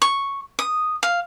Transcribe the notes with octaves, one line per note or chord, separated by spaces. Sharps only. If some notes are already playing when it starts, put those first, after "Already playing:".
C#6
D#6
F5